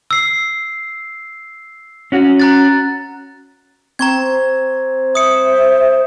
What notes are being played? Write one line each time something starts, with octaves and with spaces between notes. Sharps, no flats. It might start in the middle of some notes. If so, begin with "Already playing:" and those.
E6 C7
C#4 F#4
A#5 F#6 A6
C4 A#5 C#6 G#6
C5 E5 D#6 C#7